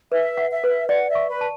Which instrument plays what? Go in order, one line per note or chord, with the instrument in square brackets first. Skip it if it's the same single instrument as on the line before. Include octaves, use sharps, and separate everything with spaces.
[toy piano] B4 [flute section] E5
[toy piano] F#5
[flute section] E5
[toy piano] B4
[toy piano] D5 [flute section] F#5
[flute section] E5
[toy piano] C#6
[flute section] B4
[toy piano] A5